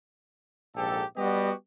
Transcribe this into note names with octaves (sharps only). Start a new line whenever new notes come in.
A#1 G#2 G4 A4
G3 B3 F#4 G4 D#5